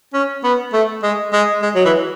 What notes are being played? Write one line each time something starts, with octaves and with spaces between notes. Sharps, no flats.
C#4
B3
A3
G#3
G#3
G#3
F#3
E3